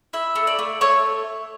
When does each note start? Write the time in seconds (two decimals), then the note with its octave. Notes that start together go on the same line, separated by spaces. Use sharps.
0.13 E4 E5
0.36 A3
0.47 D5
0.59 A3
0.81 A3 C#5